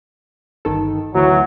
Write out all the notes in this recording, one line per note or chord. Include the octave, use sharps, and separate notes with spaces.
G1 D#3 A4
D2 E3 F#3